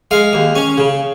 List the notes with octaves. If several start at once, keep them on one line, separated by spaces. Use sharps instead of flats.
G#3 F5
D#2
C#4
C#3